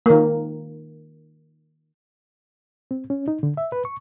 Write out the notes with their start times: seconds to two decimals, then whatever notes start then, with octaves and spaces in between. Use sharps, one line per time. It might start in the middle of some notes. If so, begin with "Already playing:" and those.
0.06 D#3 A#3
2.91 C4
3.10 C#4
3.28 D#4
3.43 D3
3.57 E5
3.72 B4
3.85 C#6